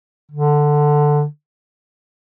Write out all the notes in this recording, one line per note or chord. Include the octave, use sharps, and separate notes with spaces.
D3